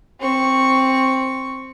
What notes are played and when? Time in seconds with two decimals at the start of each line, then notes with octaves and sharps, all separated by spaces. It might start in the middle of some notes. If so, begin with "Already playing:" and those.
0.20 C4 C#6